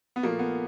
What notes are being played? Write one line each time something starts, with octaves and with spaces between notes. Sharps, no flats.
B3
A#2 F3 A3 A#3
B3